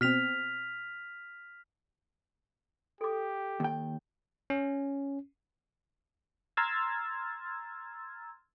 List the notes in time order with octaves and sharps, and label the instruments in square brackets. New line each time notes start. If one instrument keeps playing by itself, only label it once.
[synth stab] B2 C4 [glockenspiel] F6 B6 F7
[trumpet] G4 [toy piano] A4 D6
[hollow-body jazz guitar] D#2 G5
[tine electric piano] C#4
[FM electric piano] A#5 C6 E6 F6 G#6 A6